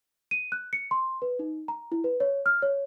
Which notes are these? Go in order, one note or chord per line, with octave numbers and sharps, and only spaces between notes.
D#7
F#6
C#7
C6
B4
D#4
A#5
E4
B4
C#5
F6
C#5